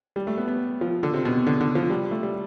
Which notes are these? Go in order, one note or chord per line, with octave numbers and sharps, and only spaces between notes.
G3
A3
B3
B3
F3
D3
C3
B2
D3
D3
F3
G3
A3
G3